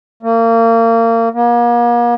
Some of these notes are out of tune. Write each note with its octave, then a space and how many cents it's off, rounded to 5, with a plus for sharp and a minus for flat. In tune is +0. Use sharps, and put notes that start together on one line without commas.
A#3 -30
A#3 +40